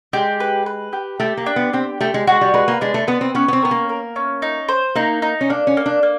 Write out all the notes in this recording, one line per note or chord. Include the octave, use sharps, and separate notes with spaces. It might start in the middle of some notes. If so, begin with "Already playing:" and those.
G#3 G4
B4
B4
G4
A3 G4
A#3
D4
B3
C4 G4
A3 G4
G#3
G#3 F#4
G3
G#3 B4
A#3
G#3 D4
A3
B3 B4
C4
B3 C#4
B3
C4
B3 A#4
A#3
A#4
C#4
D#4
C5
A#3 D#4
D#4
C#4
A#3 D4
C#4
A#3
D4
A#3